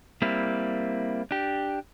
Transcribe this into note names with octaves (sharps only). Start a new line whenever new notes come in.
G3 A#3 C4 E4
D4 G4